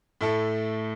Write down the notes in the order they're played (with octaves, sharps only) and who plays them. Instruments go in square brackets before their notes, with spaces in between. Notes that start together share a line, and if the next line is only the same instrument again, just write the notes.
[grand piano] A2 A3 E4 A4